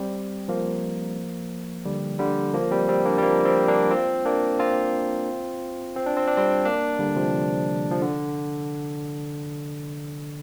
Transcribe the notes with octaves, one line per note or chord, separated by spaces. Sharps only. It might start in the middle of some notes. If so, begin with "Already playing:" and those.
Already playing: G3 C4
F3 A#3
D3 G3
D3 G3
F3 A#3
G3 C4
G3 C4
A#3 D4
G3
F3 A#3
G3 C4
A#3 D4
C4 F4
A#3 D4
C4 F4
C4
D4
C4
D4
G3 C4
A#3 D4
D3 G3
C3 F3
F3
D3